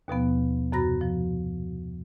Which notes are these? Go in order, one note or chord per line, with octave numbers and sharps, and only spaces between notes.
D#2 B2 F3 B3
F#2 C3 F#4 B5 A#6
F3